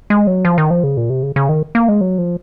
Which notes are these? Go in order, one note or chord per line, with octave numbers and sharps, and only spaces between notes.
G#3
F#3
F3
D#3
F3
C#3
A#2
C3
C#3
C#3
D#3
A#3
G#3
F#3
F3